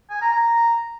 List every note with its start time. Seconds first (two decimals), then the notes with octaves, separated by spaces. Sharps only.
0.10 G#5
0.22 A#5
0.33 A#5